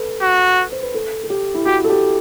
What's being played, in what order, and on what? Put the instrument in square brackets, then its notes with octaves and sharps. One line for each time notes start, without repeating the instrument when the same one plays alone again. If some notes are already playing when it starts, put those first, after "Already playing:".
Already playing: [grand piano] A4 B4
[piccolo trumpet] F#4
[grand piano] C5
B4
A4
A4
G4
E4
[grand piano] F#4 [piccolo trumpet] G4
[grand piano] A4
G4